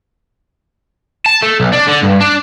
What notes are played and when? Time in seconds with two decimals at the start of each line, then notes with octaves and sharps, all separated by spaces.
1.26 A5
1.42 A3
1.60 B1
1.73 D4
1.88 D3
2.03 G2
2.21 D4